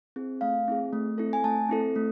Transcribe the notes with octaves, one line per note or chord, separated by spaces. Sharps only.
C4 E4 G#4
A3 F5
C4 E4 G#4
A3
C4 E4 A4
G#5
A3 A5
C4 E4 A4
A3